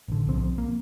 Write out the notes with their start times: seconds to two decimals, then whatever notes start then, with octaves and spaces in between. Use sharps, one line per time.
0.08 A1 D3
0.27 B1 F3 C4
0.58 A#3